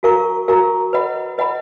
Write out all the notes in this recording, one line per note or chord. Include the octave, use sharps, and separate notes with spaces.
F#4 A#4 F5 A#5 C#6
F#4 A#4 F5 A#5 C#6
B4 D#5 F#5 B5
B4 D#5 F#5 B5